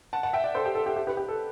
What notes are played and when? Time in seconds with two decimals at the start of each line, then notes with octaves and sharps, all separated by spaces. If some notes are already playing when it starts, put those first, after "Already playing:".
0.13 F#5 A5
0.23 F#5 A5
0.33 E5 G5
0.44 D5 F#5
0.55 A4 C5
0.66 G4
0.75 A4
0.86 G4
0.96 G4
1.07 G4 B4
1.17 G4
1.28 A4